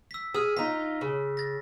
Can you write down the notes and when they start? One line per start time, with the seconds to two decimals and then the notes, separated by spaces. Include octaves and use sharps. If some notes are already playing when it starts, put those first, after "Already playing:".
0.11 E6 B6
0.34 G#4 E6 F6
0.57 D#4 F4 B6
1.01 C#3
1.37 A6 A#6